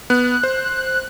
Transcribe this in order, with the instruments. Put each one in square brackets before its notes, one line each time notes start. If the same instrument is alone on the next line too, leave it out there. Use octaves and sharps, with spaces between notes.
[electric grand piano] B3 [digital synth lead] F#6
[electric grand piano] C5